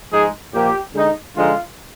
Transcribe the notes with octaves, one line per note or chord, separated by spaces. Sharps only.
G#2 F3 G#3 D#4 G#4
A#2 F3 A#3 G4
D3 G#3 D#4
D3 F3 G#3 D#4 F4